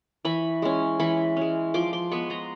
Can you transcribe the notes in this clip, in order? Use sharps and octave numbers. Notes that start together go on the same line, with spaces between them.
E3 B5 C#6
G#3 C#4
E3 B5 C#6
G#3 C#4
F3 C6 D6
C6 D6
G#3 B3 B5 C#6
A#5 C6